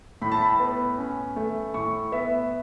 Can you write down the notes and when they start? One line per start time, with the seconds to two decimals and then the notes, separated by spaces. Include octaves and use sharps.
0.22 A2 B5
0.32 A5
0.42 B5
0.60 B3
0.98 C#4
1.36 A3
1.74 A2 C#6
2.12 B3 E5